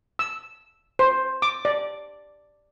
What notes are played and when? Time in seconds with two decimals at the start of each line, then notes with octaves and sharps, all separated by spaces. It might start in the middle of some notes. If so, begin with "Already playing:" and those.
0.19 E6
0.99 C5
1.42 D6
1.65 D5